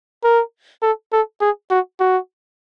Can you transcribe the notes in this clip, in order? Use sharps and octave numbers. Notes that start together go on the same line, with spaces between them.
A#4
A4
A4
G#4
F#4
F#4